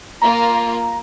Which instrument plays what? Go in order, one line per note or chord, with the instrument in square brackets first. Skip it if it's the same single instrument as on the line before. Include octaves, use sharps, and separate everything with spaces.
[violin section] A#3 F4 [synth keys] A#5